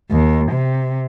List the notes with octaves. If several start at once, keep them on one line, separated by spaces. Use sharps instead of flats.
D#2
C3